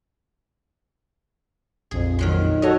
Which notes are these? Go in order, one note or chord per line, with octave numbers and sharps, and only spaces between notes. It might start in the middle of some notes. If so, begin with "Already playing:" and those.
A#1 F2 G#4
D#3 F#3 C6
F#4 A4 C#5 D#5 A#5